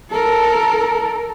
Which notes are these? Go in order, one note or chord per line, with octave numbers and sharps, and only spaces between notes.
A4 A#4